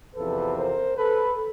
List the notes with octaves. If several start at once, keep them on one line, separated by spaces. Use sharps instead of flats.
E2 C3 F3 A4 B4
A#4 C5
A4 B4